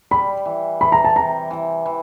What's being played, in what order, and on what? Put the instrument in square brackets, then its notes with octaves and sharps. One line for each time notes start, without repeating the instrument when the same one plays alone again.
[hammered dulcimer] G3 [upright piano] B5
[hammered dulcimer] E3
[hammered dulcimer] E3 [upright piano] B5
[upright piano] A#5
A5
[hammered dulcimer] C3 [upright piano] A#5
[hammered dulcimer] E3
E3